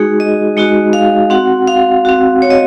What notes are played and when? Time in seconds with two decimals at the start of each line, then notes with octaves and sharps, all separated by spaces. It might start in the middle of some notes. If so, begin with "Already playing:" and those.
Already playing: G#3 D#4 F#4 G#4
0.20 D#5
0.57 G#3 D#4 F#4 D#5
0.93 F5
1.30 C4 F#4 F#5
1.67 F5
2.05 C4 F#4
2.42 C#5
2.50 D#5